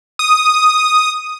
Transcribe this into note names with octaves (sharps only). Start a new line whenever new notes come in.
D#6